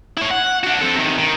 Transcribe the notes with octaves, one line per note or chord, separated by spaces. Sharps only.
E4 C#5
F#5
D4 F#4
C4 A4
C3 D#3
D#3